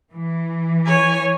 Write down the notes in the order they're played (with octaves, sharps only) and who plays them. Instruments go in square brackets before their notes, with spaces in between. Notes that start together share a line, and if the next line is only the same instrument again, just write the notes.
[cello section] E3
[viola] C#5 G#5